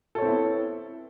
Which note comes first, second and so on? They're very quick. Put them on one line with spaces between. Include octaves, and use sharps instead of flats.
A4 C#5 C4 E4 B3